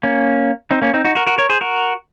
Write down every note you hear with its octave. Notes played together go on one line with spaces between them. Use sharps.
A#3 C#4
C4 D#4
A#3 C#4
C4 D#4
D#4 F#4
F#4 A#4
F#4 A#4
A#4 C#5
G#4 C5
F#4 A#4